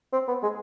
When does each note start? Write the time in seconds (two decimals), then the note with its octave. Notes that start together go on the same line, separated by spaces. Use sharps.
0.13 C4
0.28 B3
0.43 G#3